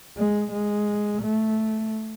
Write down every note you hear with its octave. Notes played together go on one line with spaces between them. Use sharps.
G#3
G#3
A3